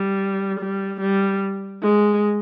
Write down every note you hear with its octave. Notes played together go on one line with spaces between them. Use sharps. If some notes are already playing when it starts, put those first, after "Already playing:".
Already playing: G3
G3
G3
G#3